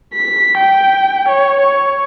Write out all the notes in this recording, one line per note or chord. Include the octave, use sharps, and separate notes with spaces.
B6
G5
C#5
C#5